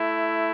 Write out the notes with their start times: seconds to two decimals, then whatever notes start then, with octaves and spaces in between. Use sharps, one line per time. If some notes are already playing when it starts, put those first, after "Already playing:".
Already playing: A3 E4